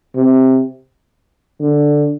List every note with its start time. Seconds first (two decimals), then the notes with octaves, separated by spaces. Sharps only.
0.16 C3
1.60 D3